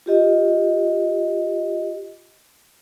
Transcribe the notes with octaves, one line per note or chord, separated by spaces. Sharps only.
F4 G4 D#5